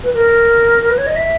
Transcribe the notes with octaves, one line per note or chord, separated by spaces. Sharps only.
B4
A#4
A#4
B4
C#5
D#5
E5